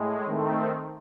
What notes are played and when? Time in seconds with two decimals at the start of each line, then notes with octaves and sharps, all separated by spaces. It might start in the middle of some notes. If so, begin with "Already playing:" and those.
Already playing: A2 G#3
0.25 D#3 A3 C4